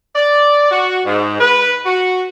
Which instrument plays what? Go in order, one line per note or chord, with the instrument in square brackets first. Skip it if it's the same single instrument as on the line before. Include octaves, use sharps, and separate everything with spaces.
[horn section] D5
F#4
G#2
B4
F#4